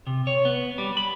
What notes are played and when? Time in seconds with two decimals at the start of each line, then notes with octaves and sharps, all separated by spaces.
0.07 C3
0.27 C#5
0.45 B3
0.78 G3
0.97 B5